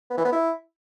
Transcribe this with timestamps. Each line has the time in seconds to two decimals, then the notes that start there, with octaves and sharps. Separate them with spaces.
0.10 B3
0.18 E3
0.25 B3
0.32 E4